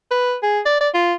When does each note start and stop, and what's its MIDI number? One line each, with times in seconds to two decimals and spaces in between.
0.11 0.35 71
0.43 0.60 68
0.65 0.79 74
0.80 0.89 74
0.94 1.14 65